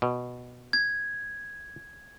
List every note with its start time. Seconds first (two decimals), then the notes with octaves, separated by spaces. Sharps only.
0.02 B2
0.73 G#6